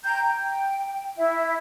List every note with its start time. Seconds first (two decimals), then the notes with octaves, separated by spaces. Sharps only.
0.04 G5 A#5 G6
0.28 G5
1.17 E4 E5